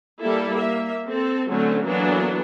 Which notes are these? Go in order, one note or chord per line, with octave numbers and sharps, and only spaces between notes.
G3 A#3 E4 A4
A#3 E5
C4 A4
D3 F#3 A3 C4 C#4
E3 F#3 A#3 B3 D4 A4